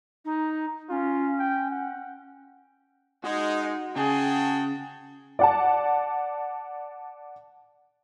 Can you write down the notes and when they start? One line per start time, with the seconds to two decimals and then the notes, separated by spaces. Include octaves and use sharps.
0.24 D#4
0.89 C#4 F4
1.39 G5
1.70 F#5
3.24 G#3 D#4 F#4
3.96 C#3 F#4 G#4 G5 A5
5.39 D5 F#5 A5